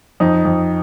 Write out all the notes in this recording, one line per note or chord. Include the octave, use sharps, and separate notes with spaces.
F2 D#4
F2